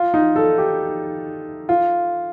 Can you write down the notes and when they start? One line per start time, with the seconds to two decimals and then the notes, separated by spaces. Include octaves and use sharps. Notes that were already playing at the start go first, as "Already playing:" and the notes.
Already playing: F4
0.14 D#4
0.36 A4
0.58 G4
1.69 F4